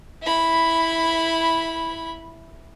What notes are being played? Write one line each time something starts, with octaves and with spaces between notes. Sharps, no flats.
E4 B5